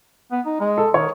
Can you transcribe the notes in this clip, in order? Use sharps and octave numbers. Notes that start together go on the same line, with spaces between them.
B3
D#4
G#3
A4
D#3 C#5